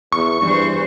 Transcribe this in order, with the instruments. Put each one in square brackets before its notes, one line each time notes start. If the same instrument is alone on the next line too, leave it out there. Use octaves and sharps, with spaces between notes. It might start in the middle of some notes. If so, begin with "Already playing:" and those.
[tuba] E2 [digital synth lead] C#6
[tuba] G2 [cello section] E3 C5